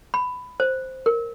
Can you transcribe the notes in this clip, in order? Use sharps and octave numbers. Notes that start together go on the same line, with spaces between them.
B5
C5
A#4